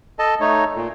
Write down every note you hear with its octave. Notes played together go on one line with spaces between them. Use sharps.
A4 D#5 A5
A3 D#4 C#5
A#2